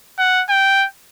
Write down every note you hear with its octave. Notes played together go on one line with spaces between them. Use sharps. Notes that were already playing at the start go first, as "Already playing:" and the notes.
F#5
G5